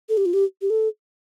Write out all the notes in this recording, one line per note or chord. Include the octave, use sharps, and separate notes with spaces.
A4
G4
F4
G4
G4
A4